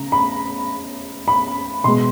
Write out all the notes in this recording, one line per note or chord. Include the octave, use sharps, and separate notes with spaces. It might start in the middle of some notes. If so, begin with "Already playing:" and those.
Already playing: C#3 A#5
B5
B5
B2 G#3 C6